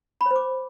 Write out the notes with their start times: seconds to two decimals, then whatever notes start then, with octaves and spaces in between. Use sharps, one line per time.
0.21 B5
0.26 C#5
0.31 C5
0.36 D6